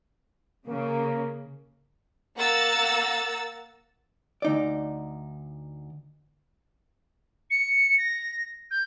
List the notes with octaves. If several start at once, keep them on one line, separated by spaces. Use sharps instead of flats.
C#3 A#3
A#3 F#5 A#5 E6 A6
D2 D#4 D5
C#7
A#6
G6